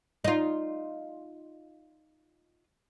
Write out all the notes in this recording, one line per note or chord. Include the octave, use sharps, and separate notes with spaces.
D#4 F4